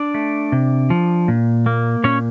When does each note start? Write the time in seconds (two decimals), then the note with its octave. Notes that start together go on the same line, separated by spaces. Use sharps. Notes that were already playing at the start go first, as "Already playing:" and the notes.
Already playing: D4 D5
0.14 A3
0.52 C3
0.90 F3
1.28 A#2
1.66 A#3
2.04 A#2 C#4 C#5